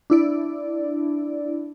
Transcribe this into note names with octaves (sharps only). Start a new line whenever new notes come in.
D4 E4 D5